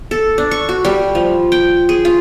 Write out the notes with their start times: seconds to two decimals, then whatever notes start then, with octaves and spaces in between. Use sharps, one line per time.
0.11 A4
0.38 D4
0.51 C#6
0.69 F#4
0.85 G3
1.15 F3
1.52 G5
1.89 G#4
2.05 F4